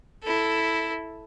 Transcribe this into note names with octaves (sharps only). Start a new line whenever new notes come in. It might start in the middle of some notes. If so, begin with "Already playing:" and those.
E4 A4